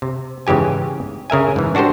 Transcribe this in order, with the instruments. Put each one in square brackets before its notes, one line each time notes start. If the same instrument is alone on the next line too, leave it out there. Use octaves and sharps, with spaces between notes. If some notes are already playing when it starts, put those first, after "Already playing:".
[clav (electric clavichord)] C3
G#2 C#3 E3 G4 G#5
C#3 A#4 E5 G#5
G#2 E3
D4 F#4 G4 A4 C5